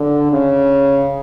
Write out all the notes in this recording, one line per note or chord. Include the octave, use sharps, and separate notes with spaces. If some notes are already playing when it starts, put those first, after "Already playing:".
Already playing: D3
C#3